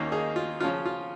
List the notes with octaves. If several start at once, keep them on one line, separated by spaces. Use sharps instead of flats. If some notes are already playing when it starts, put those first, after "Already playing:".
Already playing: D#2 D#3 A#3 C#4
D#4 G#4
F4
C#3 F3 C#4 F4
F4